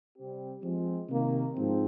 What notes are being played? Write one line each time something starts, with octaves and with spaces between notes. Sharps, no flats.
C3 G3 C4 G4
F3 G#3 C4
C3 D#3 A#3
G#2 F3 C4